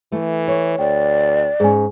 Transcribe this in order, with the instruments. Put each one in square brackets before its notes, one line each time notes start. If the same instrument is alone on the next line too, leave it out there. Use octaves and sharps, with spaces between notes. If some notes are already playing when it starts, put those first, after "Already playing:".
[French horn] E3 [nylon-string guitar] A3
[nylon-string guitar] C#5
[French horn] D2 [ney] D5 [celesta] G5
[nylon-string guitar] G#2 C#4 [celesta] G#4 G#5